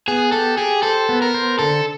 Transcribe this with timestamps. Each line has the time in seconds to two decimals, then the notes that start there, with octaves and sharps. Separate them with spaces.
0.08 B3 G#4
0.32 G4 A4
0.58 G4 G#4
0.83 A4 C5
1.09 B3
1.22 A#4
1.34 C5
1.59 D3 A4